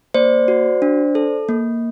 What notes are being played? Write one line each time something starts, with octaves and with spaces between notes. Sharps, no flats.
A#3 C5 D5
F#4
D4
A4
A#3